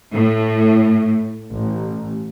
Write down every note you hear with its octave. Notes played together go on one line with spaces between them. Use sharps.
A2
A1